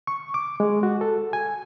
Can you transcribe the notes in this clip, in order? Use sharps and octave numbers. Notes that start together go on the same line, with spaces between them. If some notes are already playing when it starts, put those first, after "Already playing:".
C#6
D6
G#3
F#4
A4
G#5